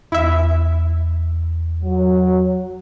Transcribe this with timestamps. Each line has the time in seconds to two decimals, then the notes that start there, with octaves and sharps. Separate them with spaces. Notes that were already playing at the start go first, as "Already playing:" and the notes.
0.12 E2 E4 E5
1.83 F#3